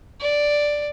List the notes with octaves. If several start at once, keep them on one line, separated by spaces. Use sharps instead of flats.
D5